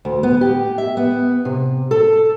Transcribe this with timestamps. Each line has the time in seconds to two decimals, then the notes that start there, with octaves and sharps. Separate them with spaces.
0.05 D2
0.23 B3
0.41 G4
0.78 E5
0.97 B3
1.45 C3
1.91 A4